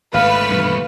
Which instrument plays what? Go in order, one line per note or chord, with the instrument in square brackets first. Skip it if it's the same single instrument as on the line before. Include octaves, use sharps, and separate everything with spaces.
[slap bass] G#1 [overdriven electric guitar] D#2 A3 [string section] B4 [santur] F5
[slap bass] G2 B2 E3